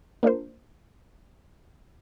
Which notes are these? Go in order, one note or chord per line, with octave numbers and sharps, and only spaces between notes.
A#3 D4 F4 A#4 C5